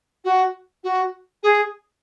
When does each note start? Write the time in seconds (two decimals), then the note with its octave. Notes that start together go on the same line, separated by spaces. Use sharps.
0.25 F#4
0.84 F#4
1.43 G#4